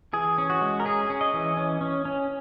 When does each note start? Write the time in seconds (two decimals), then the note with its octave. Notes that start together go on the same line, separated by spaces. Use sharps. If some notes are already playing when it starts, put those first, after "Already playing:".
0.13 E3 G#4
0.38 C#4
0.50 F#4
0.61 G#3
0.80 A#4
0.85 C#4 G#4
1.10 C#4
1.21 D#5
1.34 E3
1.57 C#4
1.81 C#4
2.05 C#4